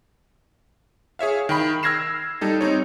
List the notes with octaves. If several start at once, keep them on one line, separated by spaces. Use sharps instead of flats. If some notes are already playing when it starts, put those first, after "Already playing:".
G#4 C#5 E5 F5
D#3 G5 B5
E6 F6 G#6 A#6 C7 E7
G3 D#4 A4
C4 D#4 C#5